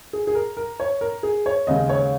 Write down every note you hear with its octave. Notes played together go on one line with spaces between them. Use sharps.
G#4
G#4
A#4
A#4
C#5
A#4
G#4
C#5
D#2 C#3 G#3 D#5
C#5